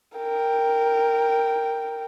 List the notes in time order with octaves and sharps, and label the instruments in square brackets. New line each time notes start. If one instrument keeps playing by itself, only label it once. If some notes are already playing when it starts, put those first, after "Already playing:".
[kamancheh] A#4 G5